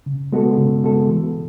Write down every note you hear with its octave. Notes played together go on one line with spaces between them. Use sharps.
C#3
G#3 B3 F#4 A4
C#3
G#3 B3 F#4 A4
E3